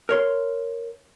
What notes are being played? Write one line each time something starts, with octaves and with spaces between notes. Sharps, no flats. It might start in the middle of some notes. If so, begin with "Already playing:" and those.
A#4 C#5 C6